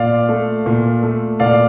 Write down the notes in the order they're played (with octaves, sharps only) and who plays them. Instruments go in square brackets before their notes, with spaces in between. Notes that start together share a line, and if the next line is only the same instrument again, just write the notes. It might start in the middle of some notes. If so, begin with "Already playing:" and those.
Already playing: [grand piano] A#2 D5 F5
A3
A#2
A3
A#2 D5 F5